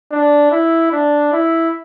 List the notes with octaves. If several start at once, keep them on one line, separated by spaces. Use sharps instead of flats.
D4
E4
D4
E4